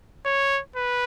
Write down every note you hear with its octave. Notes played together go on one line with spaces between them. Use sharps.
C#5
B4